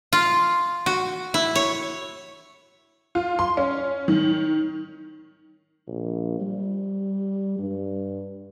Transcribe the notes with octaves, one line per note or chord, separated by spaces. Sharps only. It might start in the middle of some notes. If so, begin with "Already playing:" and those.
F4
F#4
E4
C#5
F4
C6
C#4
D#3
A#1
G3
G2